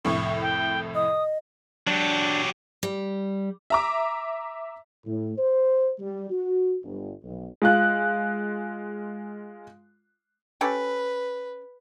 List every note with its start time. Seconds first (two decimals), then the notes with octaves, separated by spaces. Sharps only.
0.05 C2 F2 A2 C#6
0.41 G5
0.95 D#5 D#6
1.87 F#3 D4 G4
2.83 G3
3.70 E5 A#5 D6
5.05 A2
5.37 C5
5.99 G3
6.31 F#4
6.83 G1
7.23 B1
7.62 G#3 F4 F#6
10.61 C#4 G4 A4 B4